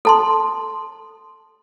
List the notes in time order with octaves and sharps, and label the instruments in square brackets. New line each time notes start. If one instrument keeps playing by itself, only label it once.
[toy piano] A4 A5 C6